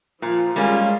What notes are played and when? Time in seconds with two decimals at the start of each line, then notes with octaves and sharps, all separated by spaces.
0.22 A#2 F3
0.56 G3 G#3 A#3 C#4 F4